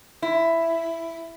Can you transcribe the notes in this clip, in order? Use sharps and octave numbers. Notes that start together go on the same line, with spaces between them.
E4